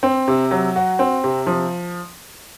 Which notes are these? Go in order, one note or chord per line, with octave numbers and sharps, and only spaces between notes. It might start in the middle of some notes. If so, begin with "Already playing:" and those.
C4
C3
F#3
F#4
C4
C3
F3